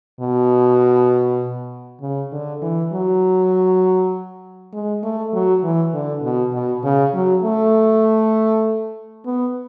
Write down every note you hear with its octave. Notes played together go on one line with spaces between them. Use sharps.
B2
C#3
D3
E3
F#3
G#3
A3
F#3
E3
D3
B2
B2
C#3
F#3
A3
B3